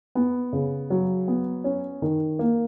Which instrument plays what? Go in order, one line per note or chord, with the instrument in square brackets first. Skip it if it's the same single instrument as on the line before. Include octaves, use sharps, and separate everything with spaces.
[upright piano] B3
C#3
F#3
B3
C#4
D#3
A#3